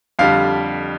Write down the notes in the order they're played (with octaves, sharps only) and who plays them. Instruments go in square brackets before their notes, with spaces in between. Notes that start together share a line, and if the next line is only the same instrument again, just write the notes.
[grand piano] F2 D3 G3 F5